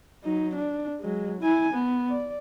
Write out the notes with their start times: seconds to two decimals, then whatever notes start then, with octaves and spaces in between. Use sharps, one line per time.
0.24 F#3 D#4
0.55 D4
1.00 F#3 G#3
1.41 E4 G#5
1.73 B3
2.09 D5